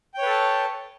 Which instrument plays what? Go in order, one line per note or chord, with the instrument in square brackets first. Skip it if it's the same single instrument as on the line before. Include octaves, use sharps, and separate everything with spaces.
[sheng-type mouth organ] G5
C#5
B4
A4
A5